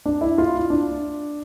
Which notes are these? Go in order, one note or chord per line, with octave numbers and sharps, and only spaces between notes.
D4
E4
F4
E4
D4